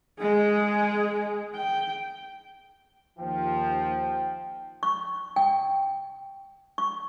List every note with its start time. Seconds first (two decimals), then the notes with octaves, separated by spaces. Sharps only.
0.19 G#3 G#4
1.56 G5
3.19 D#2 F3 G5
4.83 C#6
5.36 G5
6.78 C#6